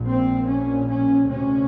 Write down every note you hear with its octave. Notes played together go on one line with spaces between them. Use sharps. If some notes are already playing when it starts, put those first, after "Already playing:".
Already playing: A#1 A#2
C4
C#4
C#4
D2 C3 C#4